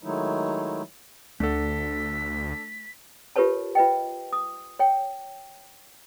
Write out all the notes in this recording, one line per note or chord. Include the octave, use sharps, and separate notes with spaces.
D#3 F#3 G#3 A3 D#4 E4
D2 A3 D4 A4 F#5 B6
F4 G4 A#4 B4 C#5 A5
F4 B4 D#5 G5
D#6
C#5 G5